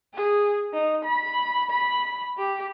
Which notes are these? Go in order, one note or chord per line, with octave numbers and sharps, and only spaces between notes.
G#4
D#4
B5
B5
G4